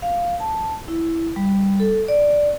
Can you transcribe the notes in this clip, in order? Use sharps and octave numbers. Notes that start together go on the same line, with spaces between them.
F5
A5
E4
G3
A4
D5